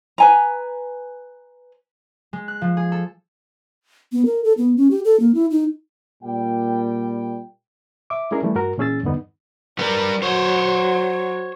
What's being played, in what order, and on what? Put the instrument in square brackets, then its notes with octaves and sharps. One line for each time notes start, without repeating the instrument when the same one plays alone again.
[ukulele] B4 G#5 A#5
[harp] G#3
F#6
F3
G#4
A4
[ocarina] B3
A#4
A4
B3
C#4
G4
A4
A#3
E4
D#4
[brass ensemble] A#2 G3 G5
[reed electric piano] E5 D6
G#3 C#4 D4 E4 G#4 A#4
E3 G3 A3
G2 F#4 A#4
A#2 E3 C#4 G#4 E6 A6
E2 G2 D3 B3 D#4
[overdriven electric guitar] G3 B4 [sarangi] A#4
[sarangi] F#3 [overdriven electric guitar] C5 C#5